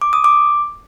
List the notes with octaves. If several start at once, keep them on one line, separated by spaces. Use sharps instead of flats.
D6
D#6
D6